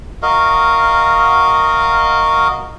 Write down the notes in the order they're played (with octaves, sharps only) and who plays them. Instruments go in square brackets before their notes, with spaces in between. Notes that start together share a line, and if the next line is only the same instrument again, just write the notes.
[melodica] F#4 A#4 D#5 F5